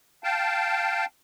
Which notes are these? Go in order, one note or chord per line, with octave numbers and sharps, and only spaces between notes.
F5 G5 A5